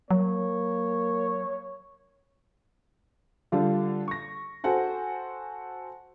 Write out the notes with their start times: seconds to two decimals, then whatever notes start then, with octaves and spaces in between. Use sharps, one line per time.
0.11 F#3 A#3 C#5
3.52 D3 G3 F4 A4
4.08 C#6 A#6
4.64 F#4 A4 C5 F#5 G#5